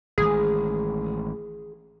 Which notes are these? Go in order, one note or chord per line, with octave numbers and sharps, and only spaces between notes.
A1 D#3 G#3 G#4